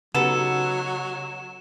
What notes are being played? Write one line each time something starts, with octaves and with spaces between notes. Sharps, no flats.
C#3 F#3 B3 D#4 G4 A4 C#7 E7